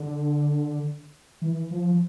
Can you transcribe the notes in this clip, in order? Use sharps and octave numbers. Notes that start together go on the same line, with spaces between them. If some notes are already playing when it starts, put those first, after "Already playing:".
Already playing: D3
E3
F3